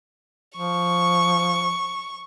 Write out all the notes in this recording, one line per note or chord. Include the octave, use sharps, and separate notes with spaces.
F3 C#6